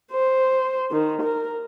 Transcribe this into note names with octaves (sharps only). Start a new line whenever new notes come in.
C5
D#3
A#4